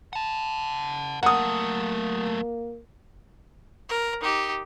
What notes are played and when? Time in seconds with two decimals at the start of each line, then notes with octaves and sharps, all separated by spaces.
0.13 F#5 A5
1.23 F#3 A3 A#3 F#5 D#6
3.89 A#4
4.21 D#4 G4